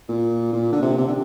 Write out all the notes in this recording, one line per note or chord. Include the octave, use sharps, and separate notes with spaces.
A#2
A#2
D3
C3
C3
D3